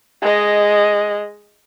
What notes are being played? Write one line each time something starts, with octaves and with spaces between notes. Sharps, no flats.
G#3 D#5